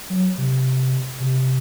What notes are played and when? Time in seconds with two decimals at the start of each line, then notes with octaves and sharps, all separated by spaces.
0.10 F#3
0.38 C3
1.20 C3